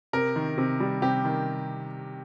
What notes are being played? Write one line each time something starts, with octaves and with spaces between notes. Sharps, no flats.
C3 A#4
D#3
C3
G3
C3 G4
D#3